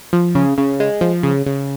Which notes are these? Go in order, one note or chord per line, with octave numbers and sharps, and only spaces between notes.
F3
C#3
C#3
G#3
F3
C#3
C#3